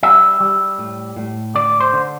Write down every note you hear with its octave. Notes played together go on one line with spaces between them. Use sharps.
G3 E5
G3
A2
A2
D3 D5
C5
D3